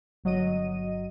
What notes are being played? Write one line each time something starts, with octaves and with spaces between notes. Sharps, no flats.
G1 F#3 D#5 D#7